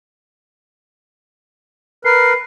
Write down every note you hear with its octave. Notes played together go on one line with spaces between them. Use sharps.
A#4 B4 C7